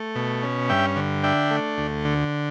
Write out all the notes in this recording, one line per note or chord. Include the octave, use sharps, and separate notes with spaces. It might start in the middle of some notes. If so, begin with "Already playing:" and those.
Already playing: A3
B2
C#4
G2 E5 G5
D3
D4 E5 G5
A3
D2
D3